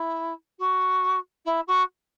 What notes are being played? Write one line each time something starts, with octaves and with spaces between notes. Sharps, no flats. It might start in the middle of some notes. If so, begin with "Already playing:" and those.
Already playing: E4
F#4
E4
F#4